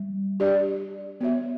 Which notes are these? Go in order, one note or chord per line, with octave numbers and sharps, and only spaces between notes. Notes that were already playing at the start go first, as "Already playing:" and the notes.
Already playing: G3
D4 G4 D5
B3 F#4 C#5 E5